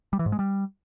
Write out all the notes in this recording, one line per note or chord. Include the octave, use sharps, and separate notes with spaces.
G3
E3
G#2
G#3
G3